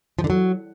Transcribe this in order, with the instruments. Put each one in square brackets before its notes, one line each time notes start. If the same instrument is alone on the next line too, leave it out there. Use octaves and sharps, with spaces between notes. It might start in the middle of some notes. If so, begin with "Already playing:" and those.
[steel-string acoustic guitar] F3
D3
F#3